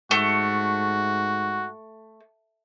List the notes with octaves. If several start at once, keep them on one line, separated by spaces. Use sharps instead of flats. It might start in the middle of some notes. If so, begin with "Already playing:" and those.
G#2 A3 F#4